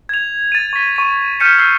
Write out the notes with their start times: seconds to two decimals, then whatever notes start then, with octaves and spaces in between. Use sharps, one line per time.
0.09 G#6 F7
0.52 A6 D#7
0.73 C#6 B6
0.96 C#6 D#7
1.40 F6 G6 B6 C#7 D#7 E7
1.58 E6 G6 C7